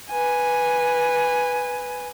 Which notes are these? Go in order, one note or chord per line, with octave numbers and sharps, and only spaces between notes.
B4 G#5